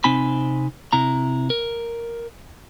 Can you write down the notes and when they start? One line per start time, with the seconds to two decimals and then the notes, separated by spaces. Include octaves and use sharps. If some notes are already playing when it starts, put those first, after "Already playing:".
0.04 C3 C4 D#4 G#5 B5
0.93 C3 E4 A#5
1.50 A#4